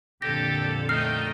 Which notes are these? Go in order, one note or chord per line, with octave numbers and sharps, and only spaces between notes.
F2 A#2 D3 G4 A4 A#6
A3 D#4 D#5 G5 F6 C7